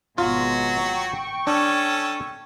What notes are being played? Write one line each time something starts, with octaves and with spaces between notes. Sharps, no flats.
G#1 B2 F#3 G#3 F4 F#4
G5 C#6
C#4 D4 A4